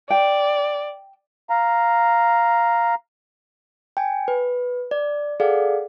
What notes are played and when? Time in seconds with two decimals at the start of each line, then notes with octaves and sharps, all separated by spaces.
0.10 D5 G5
1.50 F5 A#5
3.97 G5 G#5
4.28 B4
4.91 D5
5.40 G#4 A4 D5 F5 F#5